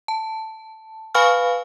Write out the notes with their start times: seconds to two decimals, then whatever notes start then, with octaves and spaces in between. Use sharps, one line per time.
0.08 A5
1.14 B4 F5 G#5 B5 C#6 F6